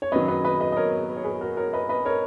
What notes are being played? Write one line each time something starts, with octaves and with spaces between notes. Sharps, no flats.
C#5
F#2 D#3 F#3 B4 D#5
B4 D#5
B4 D#5
B4 D#5
D#5
A#4 C#5
B4
C#5
G#4 B4
F#4 A#4
A#4 C#5
B4 D#5
B4 D#5
A#4 C#5